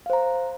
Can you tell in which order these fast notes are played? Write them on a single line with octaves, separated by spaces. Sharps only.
F5 C5 A#5